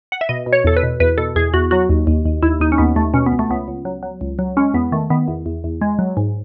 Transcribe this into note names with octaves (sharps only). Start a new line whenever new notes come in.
F#5
E5
B2 D#5
B2
C#5
E2 A4
B4
B2
E2 B4
B2 A4
E2 G#4
E2 F#4
F#3 F#4
D#2
D#2
D#2
D#2 E4
D#2 D#4
C#4
D#2 B3
D#2 A3
B2 C#4
B3
C#2
A3
C#2 B3
C#2
F#3
F#3
C#2
F#3
G#3 C#4
E2 B3
D#3 A3
D#3 B3
E2
E2
E2
G#3
F#3
G#2